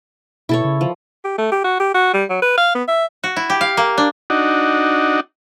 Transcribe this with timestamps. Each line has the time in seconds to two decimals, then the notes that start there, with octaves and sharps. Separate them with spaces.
0.49 B2 E4 A4 C#5
0.64 C#3
0.81 F3
1.24 G4
1.38 A3
1.52 G4
1.64 F#4
1.80 G4
1.95 F#4
2.14 G3
2.30 F#3
2.42 B4
2.58 F5
2.75 B3
2.88 E5
3.24 F#4
3.36 E4
3.50 G4
3.61 F5
3.77 A#3
3.98 D4
4.30 D4 D#4 F#4